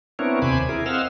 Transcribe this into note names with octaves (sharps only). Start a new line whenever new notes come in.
B3 C4 D4 E4 A#4 C#5
D#2 C3 C5 G#5 B5 D6
E4 G#4 A#4
C4 D#5 F5 F#5 E6 F6